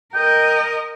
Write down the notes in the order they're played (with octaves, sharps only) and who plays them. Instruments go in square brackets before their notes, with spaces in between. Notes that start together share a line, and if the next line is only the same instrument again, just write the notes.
[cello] A#4 D#5 [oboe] G5